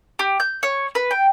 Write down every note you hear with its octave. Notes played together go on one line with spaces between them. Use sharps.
G4
G6
C#5
B4
G5